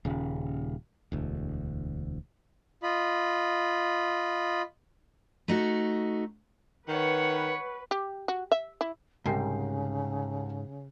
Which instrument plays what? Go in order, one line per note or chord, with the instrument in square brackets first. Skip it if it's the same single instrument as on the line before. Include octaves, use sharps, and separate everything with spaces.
[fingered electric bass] D#1 C#3
E1 D2
[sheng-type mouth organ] F4 D#5 B5
[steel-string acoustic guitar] A3 D#4 F#4
[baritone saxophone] D#3 [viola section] B4 [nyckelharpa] C#5 F#5
[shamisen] G4
F#4
E5
E4
[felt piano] C2 G5 C7 [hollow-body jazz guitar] G#2 [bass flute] C#3